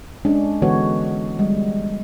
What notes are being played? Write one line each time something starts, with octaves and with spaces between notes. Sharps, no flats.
G#3 C#4 D4
D3 E3 G#3 B3 F#4 C#5
G3 G#3